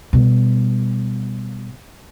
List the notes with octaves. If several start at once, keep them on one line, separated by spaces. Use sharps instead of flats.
B2 G3